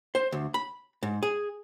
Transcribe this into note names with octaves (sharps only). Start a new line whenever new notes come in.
C5
D2
B5
G#2
G#4